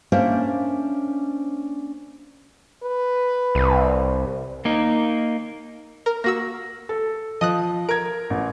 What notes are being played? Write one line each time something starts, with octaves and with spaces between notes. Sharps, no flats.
A#3 C#4 D4 C5 E5
B4
C2
A#3 D#4
A#4
A#3 F#4 E6 A#6
A4
F3 D#5 D#6 F#6
A#4 G#6 D7
A1